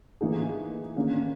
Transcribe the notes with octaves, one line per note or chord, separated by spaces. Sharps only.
E3 A#3 D#4 G#4
D#3 A#3 C#4